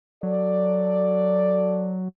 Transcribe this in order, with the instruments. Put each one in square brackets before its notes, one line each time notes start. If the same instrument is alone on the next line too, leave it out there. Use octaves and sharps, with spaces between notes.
[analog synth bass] F#3 [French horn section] A4 D5